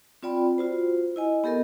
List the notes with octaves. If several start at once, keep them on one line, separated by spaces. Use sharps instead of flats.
C4 F4 D5 G5 B5
F4 F#4 C5
E4 D#5 G#5
B3 G4 A4 A#4 D#5